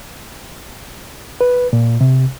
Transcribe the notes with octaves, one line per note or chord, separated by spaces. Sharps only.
B4
A#2
C3